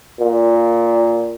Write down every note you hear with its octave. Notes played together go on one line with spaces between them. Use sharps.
A#2